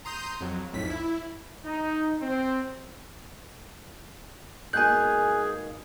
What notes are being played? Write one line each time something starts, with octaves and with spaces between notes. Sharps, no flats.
A#5 C6 D#6 G6
F2 F#3
B1 F2 A2 B6
E4
D#4
C4
G#2 B2 A#3 G#4 G#5 F#6 G6